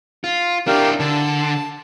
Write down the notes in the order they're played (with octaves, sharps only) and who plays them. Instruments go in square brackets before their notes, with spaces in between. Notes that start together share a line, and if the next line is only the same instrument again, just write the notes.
[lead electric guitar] F4
[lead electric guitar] D4 E4 [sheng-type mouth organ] G4 A#4 F5
[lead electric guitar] D3 [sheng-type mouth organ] A5